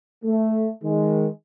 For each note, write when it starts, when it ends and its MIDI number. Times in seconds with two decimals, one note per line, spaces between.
0.25 0.69 57
0.84 1.27 51
0.84 1.27 56